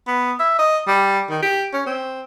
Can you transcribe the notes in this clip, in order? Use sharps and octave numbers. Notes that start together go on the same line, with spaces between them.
B3
E5
D#5
G3
D#3
G4
C#4
C4